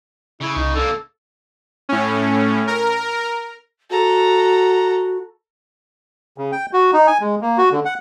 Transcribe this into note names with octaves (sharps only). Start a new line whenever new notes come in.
C#3 E4
C2 D#4
D3 A#3 A4
A2 C#4
A#4
F#4 A4 A#5
C#3
G5
F#4
D#4
G#5
G#3
A#3
F#4
D3
F#5